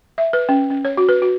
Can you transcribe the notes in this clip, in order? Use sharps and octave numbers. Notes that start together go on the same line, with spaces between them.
E5
B4
C#4
C#4
C#5
F#4
B4
F#4